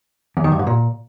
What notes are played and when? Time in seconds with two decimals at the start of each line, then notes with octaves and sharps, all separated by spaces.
0.37 E2
0.44 D#3
0.52 G2
0.59 G#2
0.67 A#2